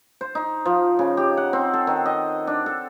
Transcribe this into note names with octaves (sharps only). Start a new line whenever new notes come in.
C5
D#4
F3
C#3
G4
F#5
C4
A4
D#3
D#5
D4
A4